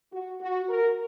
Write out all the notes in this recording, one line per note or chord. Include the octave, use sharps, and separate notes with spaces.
F#4
F#4
A#4